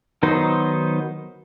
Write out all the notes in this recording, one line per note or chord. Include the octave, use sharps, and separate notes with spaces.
D#3 F#3 B3 D#4 C5